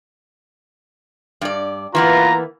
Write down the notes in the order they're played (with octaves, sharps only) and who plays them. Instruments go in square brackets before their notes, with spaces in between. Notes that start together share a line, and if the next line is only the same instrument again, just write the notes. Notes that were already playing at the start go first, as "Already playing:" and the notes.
[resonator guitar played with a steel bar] G2 D5
[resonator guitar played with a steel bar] E3 A#3 B3 [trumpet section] F4 B4 A#5